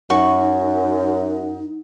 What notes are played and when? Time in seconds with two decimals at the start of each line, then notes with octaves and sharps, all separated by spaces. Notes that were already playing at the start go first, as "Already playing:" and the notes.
0.10 F#2 D#4 F#4 C#6